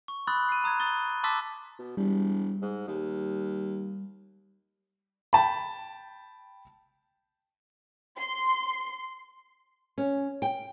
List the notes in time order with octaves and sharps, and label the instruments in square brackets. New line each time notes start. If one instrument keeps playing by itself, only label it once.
[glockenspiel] C#6
B5 C6 D#6 E6 F#6 A6
C7 D#7
A#5 D#6 F#6 G#6
D#6 A6 G7
A5 C6 D6 E6 A6 B6
[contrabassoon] B2
[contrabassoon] E1 [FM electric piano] G3
[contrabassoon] G#2
D#2
[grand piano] G5 A5 B5
[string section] C6
[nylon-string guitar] C#4
G5